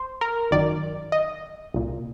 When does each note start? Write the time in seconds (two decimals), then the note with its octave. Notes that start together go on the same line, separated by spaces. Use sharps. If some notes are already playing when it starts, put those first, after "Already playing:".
Already playing: C5
0.21 A#4
0.51 G1 F#2 D#3 D5
1.12 D#5
1.74 C2 A#2